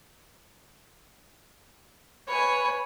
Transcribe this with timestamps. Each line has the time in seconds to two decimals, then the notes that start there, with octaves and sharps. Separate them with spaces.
2.28 B4 C#5 G#5